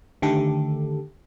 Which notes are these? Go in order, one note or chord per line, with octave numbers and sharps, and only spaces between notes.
D3 D#3 A3 G4 A4